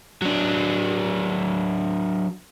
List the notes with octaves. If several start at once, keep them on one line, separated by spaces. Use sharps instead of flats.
F#3 D4